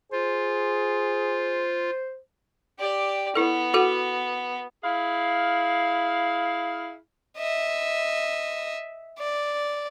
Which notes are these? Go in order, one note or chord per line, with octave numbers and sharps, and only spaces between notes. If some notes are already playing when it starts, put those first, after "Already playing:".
F4 G#4 C5
G4 D5
B3 E4 A4
F#4 A4 F#5
E4 G#4 F5
D#5 E5
D5